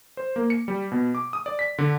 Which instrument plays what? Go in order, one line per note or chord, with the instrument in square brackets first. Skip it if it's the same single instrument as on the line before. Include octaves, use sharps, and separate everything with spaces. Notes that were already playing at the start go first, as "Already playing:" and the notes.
[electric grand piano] C5
A#3
C#7
G3
B2
D6
D#6
D5
B6
D3